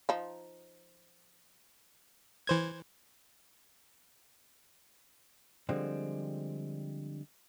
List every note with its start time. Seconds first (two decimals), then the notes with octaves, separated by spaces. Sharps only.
0.09 F3 D#4
2.47 E3 C5 G#6
5.69 D3 F3 G3 G#3 C4